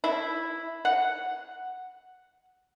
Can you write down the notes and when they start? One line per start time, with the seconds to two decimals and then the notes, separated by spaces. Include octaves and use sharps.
0.04 E4
0.85 F#5